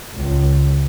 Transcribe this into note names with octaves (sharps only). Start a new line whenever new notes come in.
C#2